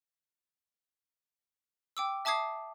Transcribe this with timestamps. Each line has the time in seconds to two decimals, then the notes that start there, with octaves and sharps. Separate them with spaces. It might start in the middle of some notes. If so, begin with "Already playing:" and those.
1.97 G5 D6 E6
2.25 E5 A5 D6 D#6 G#6 C7